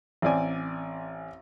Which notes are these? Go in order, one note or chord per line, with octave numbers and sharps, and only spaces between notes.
A1 C4 D5 G#5